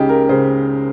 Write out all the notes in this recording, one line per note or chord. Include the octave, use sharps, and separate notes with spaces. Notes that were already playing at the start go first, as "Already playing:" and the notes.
Already playing: C#2 C#3 D#4 G4
A#4
C#3 C5